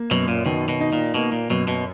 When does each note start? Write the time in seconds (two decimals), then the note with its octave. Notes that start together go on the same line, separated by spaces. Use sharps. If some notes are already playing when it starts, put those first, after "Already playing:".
Already playing: A#3
0.11 F#2 B2
0.28 A#2
0.46 B2 D#3
0.69 B2
0.80 D#4
0.93 A#2
1.14 B2 A#3
1.32 A#2
1.50 F#2 B2
1.68 B2